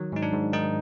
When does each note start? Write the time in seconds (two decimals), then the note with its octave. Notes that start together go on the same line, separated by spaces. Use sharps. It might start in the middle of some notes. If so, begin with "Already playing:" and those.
Already playing: D#3 F#3
0.12 G#2 D#4
0.22 D4
0.33 G#2
0.53 D#3 D#4